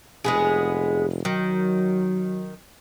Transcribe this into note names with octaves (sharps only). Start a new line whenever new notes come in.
F1 G#3 B3 G#4
D#3 F#3